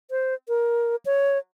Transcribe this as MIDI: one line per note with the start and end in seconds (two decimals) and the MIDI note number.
0.11 0.34 72
0.48 0.96 70
1.06 1.38 73